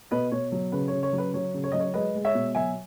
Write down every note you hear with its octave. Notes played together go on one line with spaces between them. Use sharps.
B2 B4 D#5
B2 C#5
F#3
C#3 B4
C#3 C#5
C#5
F#3
B4
F#3 C#5
C#3
C#5
F#3 D#5
C#5
G#3 B4 D#5
G#3
C#5 E5
B2
F#3 E5 G#5